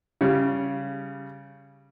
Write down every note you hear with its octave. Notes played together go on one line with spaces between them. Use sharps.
C#3 G3